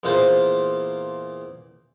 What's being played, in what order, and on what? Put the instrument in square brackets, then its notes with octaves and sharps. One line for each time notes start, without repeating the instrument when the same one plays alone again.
[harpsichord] E2 A#2 A#3 F4 C5